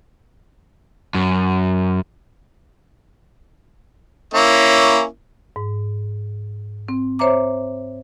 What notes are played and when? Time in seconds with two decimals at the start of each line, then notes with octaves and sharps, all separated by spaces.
1.14 F#2
4.34 A#3 C#4 E4
5.56 G#2
6.89 C4
7.19 C5 C#5 E5 A#5 D6